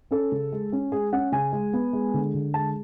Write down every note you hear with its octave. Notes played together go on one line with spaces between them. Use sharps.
C#4 A4
C#3
G#3
C#4
G#3 G#4
C#4 F#5
C#3 G#5
G#3
B3
G#3
D3
D3
G#3 A5